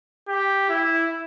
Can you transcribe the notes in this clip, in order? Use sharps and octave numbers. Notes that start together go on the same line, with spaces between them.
G4
E4